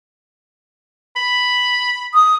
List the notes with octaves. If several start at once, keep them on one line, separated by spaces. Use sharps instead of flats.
B5
D#6